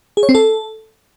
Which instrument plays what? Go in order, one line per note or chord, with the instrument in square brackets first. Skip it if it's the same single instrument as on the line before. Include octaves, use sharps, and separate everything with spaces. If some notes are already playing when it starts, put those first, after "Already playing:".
[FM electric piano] G#4
C#5
C4
A4